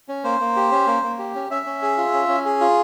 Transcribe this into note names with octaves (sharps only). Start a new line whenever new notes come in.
C#4
A#3 C5
A#3
G4
C#4
A#3
A#3
G4
C#4
C#4 E5
C#4
G#4
F4
C#4
C#4
G#4
F4